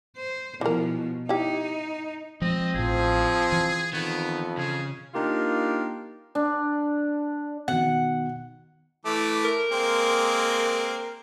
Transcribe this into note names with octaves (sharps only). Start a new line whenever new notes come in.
C5
B2 E3 F3 A#4
D#4 E4 G4
F3 G#3 C4 D#5
A1 A2 F3 G#4
E3
F2 D#3 B3
C#3 G#4
A#3 D4 D#4 F4 G4 A#4
D4
B2 D#3 F#5
E3 A3 D6
A#4
G#3 A#3 C4